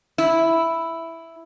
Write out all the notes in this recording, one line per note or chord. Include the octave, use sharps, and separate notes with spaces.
E4